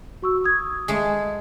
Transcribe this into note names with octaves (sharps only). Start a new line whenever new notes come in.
F#4 C#6 E6
D#6 G#6
G#3 A3 G#4